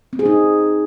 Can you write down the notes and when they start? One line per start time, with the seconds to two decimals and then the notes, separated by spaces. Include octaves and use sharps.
0.13 C4
0.19 G#4
0.26 D#4